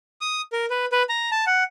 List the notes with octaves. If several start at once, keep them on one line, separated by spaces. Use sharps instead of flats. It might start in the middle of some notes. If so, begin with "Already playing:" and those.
D#6
A#4
B4
B4
A#5
A5
F#5